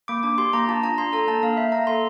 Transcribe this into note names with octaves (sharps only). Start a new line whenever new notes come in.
A#3 D6
D4 D6
G4 C6
A#3 A#5
F4 A5
D4 A#5
D4 C6
A4 A#5
A#3 A5
A#3 F5
A#3 E5
A#3 A#5
A4 C6